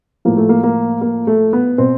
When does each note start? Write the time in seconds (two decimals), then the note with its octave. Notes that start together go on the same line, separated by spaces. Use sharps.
0.25 A2 F3 A#3
0.37 A3
0.49 A#3
0.63 A#3
1.01 A#3
1.27 A3
1.53 B3
1.78 B2 C4